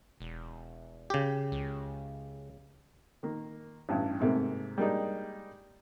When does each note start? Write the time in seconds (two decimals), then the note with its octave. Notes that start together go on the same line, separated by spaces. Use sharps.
0.21 E1
1.10 C#3 G4
1.52 C#2
3.23 D#3 A#3
3.89 A1 G2
4.20 G#2 C3 A3 A#3
4.78 G3 G#3 A#3 D4 D#4